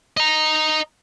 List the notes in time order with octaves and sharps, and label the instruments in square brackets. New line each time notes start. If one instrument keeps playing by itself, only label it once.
[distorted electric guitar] D#5 A#5